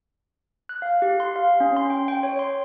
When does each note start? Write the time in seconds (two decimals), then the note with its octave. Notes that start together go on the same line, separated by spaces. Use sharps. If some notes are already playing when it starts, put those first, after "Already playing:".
0.69 F#6
0.82 F5
1.02 G4
1.20 C6
1.36 F5
1.60 C#4
1.76 C6
1.90 G5
2.08 G5
2.23 C#5
2.39 C6